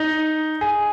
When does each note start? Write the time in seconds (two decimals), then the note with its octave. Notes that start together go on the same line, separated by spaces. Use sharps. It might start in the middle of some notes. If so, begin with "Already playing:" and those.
Already playing: D#4
0.61 G#4